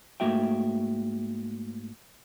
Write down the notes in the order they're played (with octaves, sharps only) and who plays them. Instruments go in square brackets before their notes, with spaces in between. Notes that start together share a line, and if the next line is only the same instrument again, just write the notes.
[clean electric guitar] G#2 A3 A#3 F#4 E5 G5